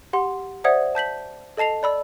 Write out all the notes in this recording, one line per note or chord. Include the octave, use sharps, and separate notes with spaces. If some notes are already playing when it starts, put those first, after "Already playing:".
G4 F#5 C6
C5 D5 E5 F#5 D#6 G#6
A5 G6 B6 F#7
A4 D#5 A5 C7 F7
D5 B5 E6